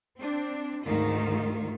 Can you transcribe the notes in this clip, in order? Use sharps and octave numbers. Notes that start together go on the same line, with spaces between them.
C4 D4
D2 G#2 D#3 F4